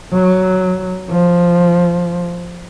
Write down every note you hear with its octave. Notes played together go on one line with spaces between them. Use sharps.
F#3
F3